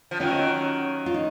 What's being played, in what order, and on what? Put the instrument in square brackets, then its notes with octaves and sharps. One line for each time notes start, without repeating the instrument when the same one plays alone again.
[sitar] F3
[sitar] D#3 F#3 [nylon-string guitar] C#4 F4
[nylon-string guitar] F4
D#4